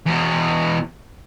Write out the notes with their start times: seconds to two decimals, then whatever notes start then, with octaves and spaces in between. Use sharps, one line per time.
0.07 E2 B2